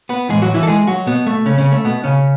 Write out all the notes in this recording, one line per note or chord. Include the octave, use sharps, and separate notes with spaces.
B3 B4
A2 E3 G#3 G#4
F#3 F#4
E3 E4
A4
G#3 G#4
F#3 F#4
B2 B3
A3
C#3 C#4
C#3 C#4
A3
B2 B3
C#3 C#4